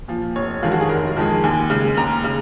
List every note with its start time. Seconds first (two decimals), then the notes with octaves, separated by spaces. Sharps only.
0.08 A#2 F3
0.36 F1 C#5
0.62 F2 D#3 G#3 F4
0.72 F#4
0.81 G#4
0.89 F1 A#4
1.17 F2 D#3 G#3
1.44 D#2 G#5
1.70 C#3 G#3
1.97 D#2 A#5
2.24 C#3